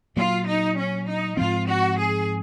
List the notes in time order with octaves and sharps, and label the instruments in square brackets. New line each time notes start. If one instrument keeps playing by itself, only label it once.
[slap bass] A#2 F#3 A#3 [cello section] F4
[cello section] D#4
C#4
D#4
[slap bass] G#2 F3 C4 [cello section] F4
[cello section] F#4
G#4